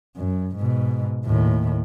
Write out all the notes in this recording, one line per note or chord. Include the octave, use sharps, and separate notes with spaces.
F#2
G#2 B2
D#2 A2